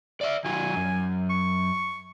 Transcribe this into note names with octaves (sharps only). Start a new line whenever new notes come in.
D5 E5
D#3 F#3 G#5
F#2
C#6